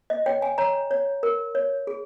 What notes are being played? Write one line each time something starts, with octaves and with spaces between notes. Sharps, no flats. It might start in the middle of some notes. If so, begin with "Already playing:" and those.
D#5
C#5 G5
G#5
C#5 A#5
C#5
A#4
C#5
G#4